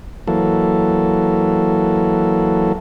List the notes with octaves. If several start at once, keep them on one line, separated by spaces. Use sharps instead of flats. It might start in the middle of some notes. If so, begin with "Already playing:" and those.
E3 F#3 A#3 A4